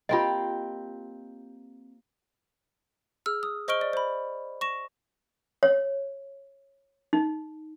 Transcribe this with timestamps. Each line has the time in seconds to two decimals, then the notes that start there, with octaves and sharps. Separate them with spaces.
0.09 A#3 C4 F4 G4 D#5
3.26 G#4 E6 F6
3.43 D#6
3.68 C5 D#5 C#6 F6 D7 G7
3.81 D5
3.93 C5 B5
4.61 C#6 A#6 E7
5.63 C#5
7.13 D#4